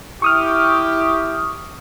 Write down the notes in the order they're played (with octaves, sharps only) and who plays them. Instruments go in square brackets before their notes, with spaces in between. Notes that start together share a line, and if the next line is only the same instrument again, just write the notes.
[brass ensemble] E4 G4 [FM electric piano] C#6 D#6 F6